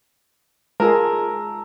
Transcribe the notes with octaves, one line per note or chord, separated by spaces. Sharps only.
G#3 F4 G#4 A#4 A5 A#5 E6